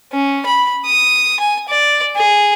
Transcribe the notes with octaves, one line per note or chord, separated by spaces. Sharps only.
C#4
B5
D#6
G#5
D5
G#4